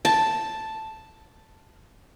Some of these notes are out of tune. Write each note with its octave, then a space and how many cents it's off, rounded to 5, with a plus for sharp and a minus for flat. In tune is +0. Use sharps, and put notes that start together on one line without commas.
A5 +0